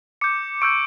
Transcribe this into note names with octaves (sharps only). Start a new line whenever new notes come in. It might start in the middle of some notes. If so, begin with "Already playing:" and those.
D6 G6 C#7
C#6 E6 G6 D7